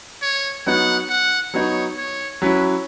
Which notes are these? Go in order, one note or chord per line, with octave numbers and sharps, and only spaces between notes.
C#5
F#3 B3 D#4 F#5
F#5
F#3 B3 D#4 C#5
C#5
F#3 C#4 E4 B4